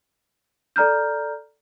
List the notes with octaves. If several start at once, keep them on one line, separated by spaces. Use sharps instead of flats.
A4 D5 A#5 F6 G6